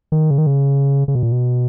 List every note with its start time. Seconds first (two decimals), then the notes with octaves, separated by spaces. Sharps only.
0.12 D#3
0.31 C#3
0.38 D#3
0.47 C#3
1.08 C#3
1.15 B2
1.23 A#2
1.32 B2